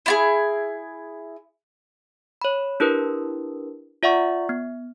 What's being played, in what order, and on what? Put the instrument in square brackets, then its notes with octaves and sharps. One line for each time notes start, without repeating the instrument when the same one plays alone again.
[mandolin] E4 F4 G#4
[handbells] C#5 B5
D4 E4 G4 A#4 B4
F4 D5 E5 F#5 C#6
B3